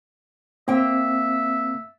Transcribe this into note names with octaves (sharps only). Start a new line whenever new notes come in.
A#3 C4 E5 G5